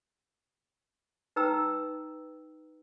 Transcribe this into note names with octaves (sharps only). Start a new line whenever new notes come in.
D#4 B4 G5 A#5 E6